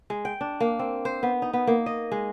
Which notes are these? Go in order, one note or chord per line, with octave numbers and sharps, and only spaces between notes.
G#3
G5
D4
A#3
C4
C5
B3
D#4
B3
A#3
D#5
G#3